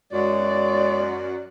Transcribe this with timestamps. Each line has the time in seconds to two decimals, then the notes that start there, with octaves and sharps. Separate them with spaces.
0.13 F#2 G#3 F#4 C#5 D5